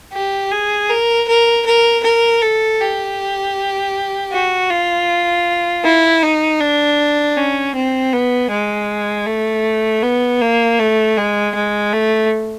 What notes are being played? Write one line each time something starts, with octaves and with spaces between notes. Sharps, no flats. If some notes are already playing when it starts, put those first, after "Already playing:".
G4
G#4
A#4
A#4
A#4
A#4
A4
G4
F#4
F4
E4
D#4
D4
C#4
C4
B3
G#3
A3
B3
A#3
A3
G#3
G#3
A3